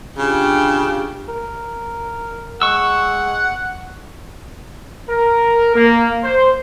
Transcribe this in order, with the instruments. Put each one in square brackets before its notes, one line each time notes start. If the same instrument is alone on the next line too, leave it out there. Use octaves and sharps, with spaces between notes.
[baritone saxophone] C#3 [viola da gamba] D4 F4 G4
[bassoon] A#4
[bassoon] G#3 [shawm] F#5 [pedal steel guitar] C#6 E6
[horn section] A#4
A#3
C5